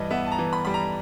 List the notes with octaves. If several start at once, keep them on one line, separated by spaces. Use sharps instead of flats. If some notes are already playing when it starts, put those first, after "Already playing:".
Already playing: G2 E3 G3 D#5
B3 E5
A5
A#5
E3
B5
G3 B5
A#5